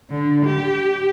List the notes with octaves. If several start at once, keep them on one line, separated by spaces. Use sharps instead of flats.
D3
G4